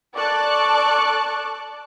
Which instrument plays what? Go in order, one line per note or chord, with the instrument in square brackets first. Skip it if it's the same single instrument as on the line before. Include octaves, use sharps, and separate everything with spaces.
[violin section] A4 D5 A5 C#6 D6 F#6